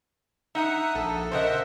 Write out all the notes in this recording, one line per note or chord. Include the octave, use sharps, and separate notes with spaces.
D#4 E5 F#5 A#5 D#6
A#1 A4
C#3 A#4 C5 D#5 E5 F#5